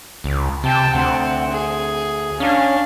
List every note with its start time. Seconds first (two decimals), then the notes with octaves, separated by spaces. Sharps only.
0.24 C#2
0.64 C3 G5 A5
0.94 D2 C4 F#5
1.51 G#4
2.40 C#4 D4 F5